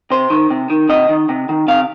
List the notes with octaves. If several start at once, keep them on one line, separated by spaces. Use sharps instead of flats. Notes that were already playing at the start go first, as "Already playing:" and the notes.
C3 C5
D#3
C3
D#3
C3 D#5
D#3
C3
D#3
C3 F5